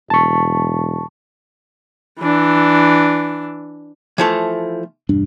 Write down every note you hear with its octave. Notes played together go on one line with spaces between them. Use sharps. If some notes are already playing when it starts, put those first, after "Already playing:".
E1 A5 C#6
E3 D4
E3 F3 A3
E1 G2 D4